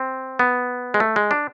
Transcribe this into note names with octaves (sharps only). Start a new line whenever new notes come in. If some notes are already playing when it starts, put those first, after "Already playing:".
Already playing: C4
B3
G#3
A3
G#3
D4